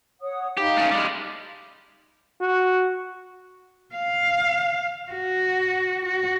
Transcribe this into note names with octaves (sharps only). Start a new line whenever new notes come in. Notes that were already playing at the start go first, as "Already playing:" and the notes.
C#5 F#5 D#6
D#4 G4 F5 B5
A3 C#4
G3 G#3 G#5
F#4
F5
F#4
F#4